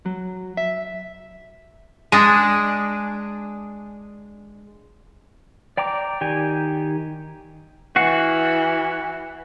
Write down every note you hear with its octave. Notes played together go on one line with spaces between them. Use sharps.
F#3
E5
G#3 D4 G#5 D#6
D5 G5 A#5 D6
D#3 G4 G#5
E3 F#4 F5 F#5